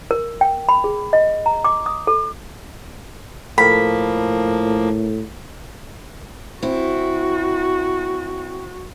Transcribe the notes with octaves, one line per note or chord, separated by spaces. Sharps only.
A#4
G5
B5
G#4
D#5
A#5
D6
D#6
A4
A2 F3 A#3 A4 A#4 B5
C4 E4 F#4